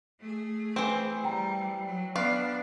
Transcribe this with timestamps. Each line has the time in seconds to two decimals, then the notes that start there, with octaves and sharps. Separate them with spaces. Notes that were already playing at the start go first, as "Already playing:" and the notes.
0.20 A3 G#4
0.76 E3 C4 D7
1.24 G3 G5 A#5
1.85 F#3
2.16 B3 D4 B4 D5 F5